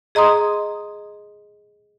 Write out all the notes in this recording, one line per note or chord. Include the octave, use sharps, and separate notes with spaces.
G#4 D#5 A#5 C6 D#6